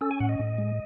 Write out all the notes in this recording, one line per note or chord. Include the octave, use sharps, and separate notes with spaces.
C#4 A4
G#5
A2 F#5
D#5
A2
G#3